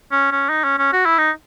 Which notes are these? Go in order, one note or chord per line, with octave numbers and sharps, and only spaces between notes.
C#4
C#4
D#4
C#4
C#4
F#4
E4
D#4